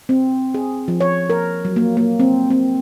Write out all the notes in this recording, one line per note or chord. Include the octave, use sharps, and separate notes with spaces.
C4
G#4
F3
C#5
A#4
F#3
A#3
A#3
C4
C4